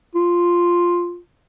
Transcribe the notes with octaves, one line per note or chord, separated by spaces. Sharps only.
F4